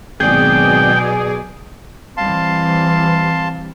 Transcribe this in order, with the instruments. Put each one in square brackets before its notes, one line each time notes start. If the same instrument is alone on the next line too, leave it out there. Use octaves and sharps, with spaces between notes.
[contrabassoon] G#1 [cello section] B2 F#3 D5 [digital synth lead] G#4 [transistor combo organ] G5
[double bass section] E3 G3 C4 [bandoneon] F5 A5 C6